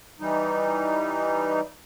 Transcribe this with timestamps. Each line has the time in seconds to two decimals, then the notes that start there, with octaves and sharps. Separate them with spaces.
0.20 E3 G3 D#4